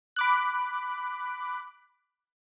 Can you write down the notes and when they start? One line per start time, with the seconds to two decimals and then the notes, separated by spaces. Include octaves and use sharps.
0.16 B5 D6 F#6